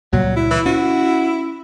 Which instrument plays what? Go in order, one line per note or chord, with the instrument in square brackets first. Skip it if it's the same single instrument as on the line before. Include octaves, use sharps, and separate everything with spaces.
[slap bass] C#2 A#2 G3 [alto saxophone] F#3
[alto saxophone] E4
[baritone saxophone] E3
[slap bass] C#4 [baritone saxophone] F#4